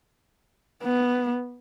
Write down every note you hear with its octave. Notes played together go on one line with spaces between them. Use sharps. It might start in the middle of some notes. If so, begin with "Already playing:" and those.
B3